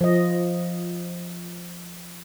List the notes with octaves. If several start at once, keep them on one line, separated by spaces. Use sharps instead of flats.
F3 D#5